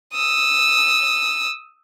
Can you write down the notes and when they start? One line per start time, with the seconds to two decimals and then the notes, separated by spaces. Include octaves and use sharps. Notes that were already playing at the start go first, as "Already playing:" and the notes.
0.14 D#6 E6